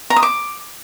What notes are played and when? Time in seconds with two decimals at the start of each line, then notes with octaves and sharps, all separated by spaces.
0.10 A#5
0.16 D#6
0.23 D6